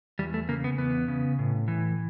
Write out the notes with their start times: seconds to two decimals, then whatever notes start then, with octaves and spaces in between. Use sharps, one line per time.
0.19 E2 G3
0.34 A3
0.49 C#3 A#3
0.64 B3
0.78 E2 B3
1.08 C#3
1.39 A2
1.68 E3